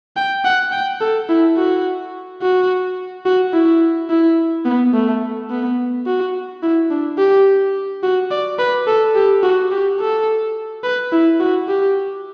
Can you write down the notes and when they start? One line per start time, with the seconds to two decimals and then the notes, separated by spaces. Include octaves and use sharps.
0.16 G5
0.44 F#5
0.72 G5
1.01 A4
1.29 E4
1.56 F#4
2.41 F#4
3.25 F#4
3.53 E4
4.09 E4
4.65 B3
4.94 A3
5.50 B3
6.06 F#4
6.63 E4
6.90 D4
7.18 G4
8.03 F#4
8.31 D5
8.59 B4
8.87 A4
9.15 G4
9.43 F#4
9.71 G4
10.00 A4
10.83 B4
11.12 E4
11.40 F#4
11.68 G4